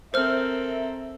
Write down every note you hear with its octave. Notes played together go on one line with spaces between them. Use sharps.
C4 A4 A#4 C5 E5 F6